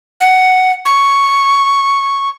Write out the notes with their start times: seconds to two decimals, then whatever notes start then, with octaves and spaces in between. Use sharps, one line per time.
0.21 F#5
0.85 C#6